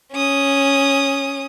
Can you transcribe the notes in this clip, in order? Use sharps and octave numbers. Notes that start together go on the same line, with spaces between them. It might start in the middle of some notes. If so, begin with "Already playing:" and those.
C#4 D#6